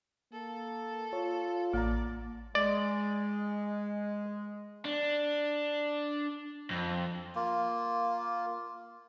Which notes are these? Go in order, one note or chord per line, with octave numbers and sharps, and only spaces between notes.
A#3 A4
F4 C#5
A1 A#3 D5 A#5
G#3 D5
D4
F2
A#3 F4